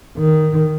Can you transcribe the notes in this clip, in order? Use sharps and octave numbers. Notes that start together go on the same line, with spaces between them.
D#3